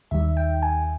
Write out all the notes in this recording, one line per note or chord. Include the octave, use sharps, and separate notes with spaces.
D#2 D#3 G3 E5
G5
G#5